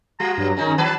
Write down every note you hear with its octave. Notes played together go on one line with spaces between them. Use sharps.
G3 F#4 A#5
G2 F#3
D#3 G#3 C#4 D#4
D#3 F#3 B4 A5